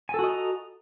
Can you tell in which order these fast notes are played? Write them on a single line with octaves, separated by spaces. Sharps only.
G#5 A4 F#4 D#5 A#5